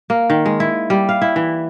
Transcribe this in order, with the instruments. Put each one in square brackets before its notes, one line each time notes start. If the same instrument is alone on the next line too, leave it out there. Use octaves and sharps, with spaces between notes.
[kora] A#3
D#3
G#3
E4
G3
F5
E4
E3